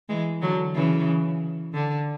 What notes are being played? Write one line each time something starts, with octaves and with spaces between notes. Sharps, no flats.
E3 G#3
D3 F#3
C#3 E3
D3